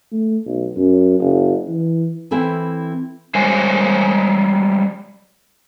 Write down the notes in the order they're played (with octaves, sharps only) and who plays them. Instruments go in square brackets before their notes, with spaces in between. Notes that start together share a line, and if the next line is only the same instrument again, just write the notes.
[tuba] A3
B1
F#2
F#1
E3
[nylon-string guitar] E3 C4 E4 A4 G#5
[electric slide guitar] G3 G#3 C5 C#5 G#5